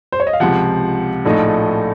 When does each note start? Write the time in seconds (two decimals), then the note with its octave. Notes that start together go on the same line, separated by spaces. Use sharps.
0.12 C5
0.20 C#5
0.27 D#5
0.33 F5
0.40 C#2 C3 F3 F#5
1.25 A#1 A2 F3 A3 D#4